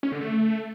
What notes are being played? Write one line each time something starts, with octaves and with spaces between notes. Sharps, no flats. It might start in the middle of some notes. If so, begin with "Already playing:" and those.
C#4
D3
A3